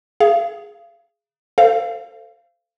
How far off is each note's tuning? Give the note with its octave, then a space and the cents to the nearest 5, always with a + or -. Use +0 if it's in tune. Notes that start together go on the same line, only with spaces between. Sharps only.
G#4 +0 F5 -35
A4 +20 C5 -15 F5 -20